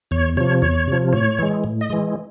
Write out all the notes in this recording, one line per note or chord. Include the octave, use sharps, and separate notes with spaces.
E2 C#5
C3 F3 C#5
E2 C#5
C3 F3
A2 C#5
E3 G#3
A2
D#5
E3 G#3